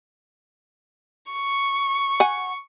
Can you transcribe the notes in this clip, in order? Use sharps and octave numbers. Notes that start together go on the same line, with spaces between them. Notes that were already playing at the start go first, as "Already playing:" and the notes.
C#6
F#5 G#5